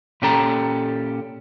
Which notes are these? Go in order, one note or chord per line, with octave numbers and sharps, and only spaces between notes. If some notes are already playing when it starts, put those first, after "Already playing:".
A#2 C#4 G4 A4 A#5